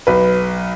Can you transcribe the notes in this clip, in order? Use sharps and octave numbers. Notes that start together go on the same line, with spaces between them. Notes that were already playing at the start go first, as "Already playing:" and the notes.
B1 B4